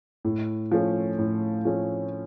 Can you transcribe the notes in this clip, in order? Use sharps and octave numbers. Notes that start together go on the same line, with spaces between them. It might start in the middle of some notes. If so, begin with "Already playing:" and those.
A2
F3 A3 C#4
A2
F3 A3 C#4